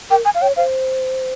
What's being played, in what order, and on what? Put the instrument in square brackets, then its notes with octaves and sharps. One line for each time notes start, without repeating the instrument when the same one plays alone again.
[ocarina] A#4 [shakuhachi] G5
[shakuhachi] G#5
F5
[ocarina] C#5 [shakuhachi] G5
[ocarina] C5 [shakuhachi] F5